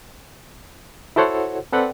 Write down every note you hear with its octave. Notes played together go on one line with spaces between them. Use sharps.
E4 F#4 A4 C5 C#5 F#5
C4 A4 B4 D5 F#5 G5